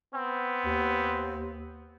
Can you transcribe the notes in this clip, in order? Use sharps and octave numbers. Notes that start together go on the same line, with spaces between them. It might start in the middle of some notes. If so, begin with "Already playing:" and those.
B3 C4
D#2